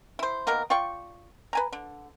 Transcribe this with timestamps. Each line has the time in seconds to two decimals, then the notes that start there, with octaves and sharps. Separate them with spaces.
0.19 E4 C5
0.47 D#3 A#3 B3 A#4
0.70 F4 D5 G5 C#6
1.53 B4 G#5 A#5
1.73 D3